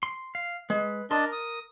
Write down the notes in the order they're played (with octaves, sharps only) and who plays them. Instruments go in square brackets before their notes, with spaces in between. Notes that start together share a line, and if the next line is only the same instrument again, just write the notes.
[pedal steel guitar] C6
F5
[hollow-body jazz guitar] G#3 [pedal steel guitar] B4
[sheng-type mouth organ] D4 D#5 A5 [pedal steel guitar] A#4 [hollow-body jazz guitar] C6
[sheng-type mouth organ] D#6